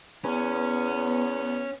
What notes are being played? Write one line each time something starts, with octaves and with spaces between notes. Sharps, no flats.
E2 B3 C#4